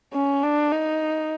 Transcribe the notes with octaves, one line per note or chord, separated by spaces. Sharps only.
C#4
D4
D#4